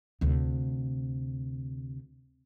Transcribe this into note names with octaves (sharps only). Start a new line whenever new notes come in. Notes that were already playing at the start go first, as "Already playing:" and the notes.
D2 C3